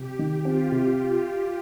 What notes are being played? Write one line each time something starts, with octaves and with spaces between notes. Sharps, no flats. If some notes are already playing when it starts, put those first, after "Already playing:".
Already playing: C3 G4
D#3
C4 F4
C3